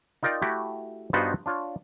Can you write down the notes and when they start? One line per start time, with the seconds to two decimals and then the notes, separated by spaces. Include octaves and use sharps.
0.23 D#4 F4 A#4 D5 G5
0.42 A3 E4 F#4 G4
1.13 G2 B3 D#4 F4 F#4 C5
1.46 D4 F4 C#5